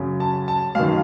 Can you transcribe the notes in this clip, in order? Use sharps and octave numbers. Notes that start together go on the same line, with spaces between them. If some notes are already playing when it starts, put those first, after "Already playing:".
Already playing: F#2 C#3
A5
A5
F#2 D#3 F5